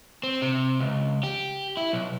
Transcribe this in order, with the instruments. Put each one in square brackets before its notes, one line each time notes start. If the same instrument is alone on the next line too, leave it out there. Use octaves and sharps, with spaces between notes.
[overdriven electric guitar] C4
C3
C#2
G4
E4
B1